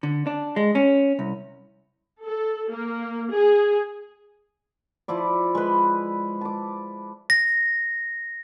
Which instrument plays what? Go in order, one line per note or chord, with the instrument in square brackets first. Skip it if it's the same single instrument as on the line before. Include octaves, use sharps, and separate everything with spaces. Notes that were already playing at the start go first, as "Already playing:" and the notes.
[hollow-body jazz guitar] D3
D4
G#3
C#4
C2
[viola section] A4
A#3
G#4
[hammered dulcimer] F3 E4 D5
G#3 B4
A5 D6
[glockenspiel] A#6